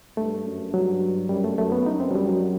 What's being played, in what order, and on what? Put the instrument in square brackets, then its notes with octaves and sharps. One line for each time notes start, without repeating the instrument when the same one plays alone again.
[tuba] G2 [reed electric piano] A3
[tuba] F#2
[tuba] G2 [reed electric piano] F#3
[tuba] F#2 [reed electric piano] G3
[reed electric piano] A3
[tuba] F#2 [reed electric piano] A3
[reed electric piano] B3
[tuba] F#2 [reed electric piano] D#4
[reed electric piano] C4
F#3
G3
F#3